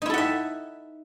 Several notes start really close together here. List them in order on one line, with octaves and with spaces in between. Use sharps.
D#4 E4 A4 F#5 E5